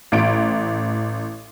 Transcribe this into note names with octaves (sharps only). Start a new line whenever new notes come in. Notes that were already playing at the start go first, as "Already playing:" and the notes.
A1 D7